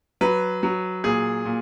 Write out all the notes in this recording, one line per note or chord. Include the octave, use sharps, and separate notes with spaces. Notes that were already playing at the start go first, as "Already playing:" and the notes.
F#3 B4
F#3
A#2 G#4
A#2